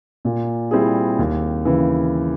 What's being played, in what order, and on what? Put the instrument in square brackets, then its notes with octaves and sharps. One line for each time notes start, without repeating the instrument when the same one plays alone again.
[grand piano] A#2
G3 C4 E4 G#4
D#2
C#3 E3